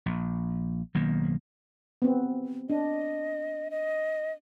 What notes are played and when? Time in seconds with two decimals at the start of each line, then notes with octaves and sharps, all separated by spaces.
0.06 A#1
0.95 B1 D#3 A#3
2.02 B3 C4
2.70 D4 D#5
3.71 D#5